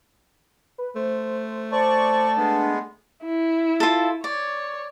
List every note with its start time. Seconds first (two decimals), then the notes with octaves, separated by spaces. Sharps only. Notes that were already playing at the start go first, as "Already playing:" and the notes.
0.78 B4
0.96 A3 C5
1.72 C5 D5 A5 C#6
2.37 G#3 B3 D4
3.24 E4
3.80 F4 A4
4.24 C#5 D5